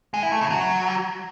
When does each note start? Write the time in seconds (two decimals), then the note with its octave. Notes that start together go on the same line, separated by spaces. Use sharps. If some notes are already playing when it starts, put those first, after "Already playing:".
0.14 G#3
0.23 E4
0.32 A3
0.41 C#3
0.50 F#3